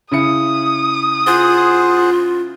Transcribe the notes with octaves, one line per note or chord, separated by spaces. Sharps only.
C#3 E4 D#6 C#7
F4 G#4 C5 F#5